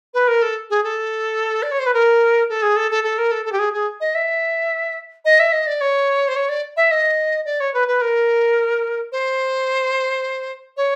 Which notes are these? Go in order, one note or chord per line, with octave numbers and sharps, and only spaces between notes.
B4
A#4
A4
G#4
A4
D5
C#5
C5
B4
A#4
A4
G#4
A4
A4
A4
A#4
A4
A4
G4
G#4
G#4
D#5
E5
D#5
E5
D#5
D5
C#5
C5
C#5
D5
E5
D#5
D5
C#5
B4
B4
A#4
C5
C#5